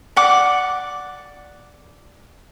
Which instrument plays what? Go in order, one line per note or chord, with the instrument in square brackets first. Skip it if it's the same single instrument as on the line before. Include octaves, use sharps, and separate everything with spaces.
[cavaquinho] D5 F#5 D6